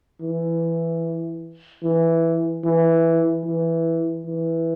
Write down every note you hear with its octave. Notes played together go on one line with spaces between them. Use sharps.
E3
E3
E3
E3
E3